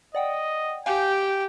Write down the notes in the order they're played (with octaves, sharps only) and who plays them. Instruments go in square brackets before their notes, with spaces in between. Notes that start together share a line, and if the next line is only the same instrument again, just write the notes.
[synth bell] D5 F#5 G5 [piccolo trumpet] D#5
[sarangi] G4 [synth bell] F5 G#5 [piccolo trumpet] G5